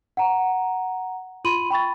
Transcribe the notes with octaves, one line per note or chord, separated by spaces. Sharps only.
F#5 A#5
F4 B5 C6 D#7 F#7
G5 B5 C#6 A6